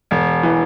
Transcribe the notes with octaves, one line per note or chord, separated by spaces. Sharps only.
E1
E3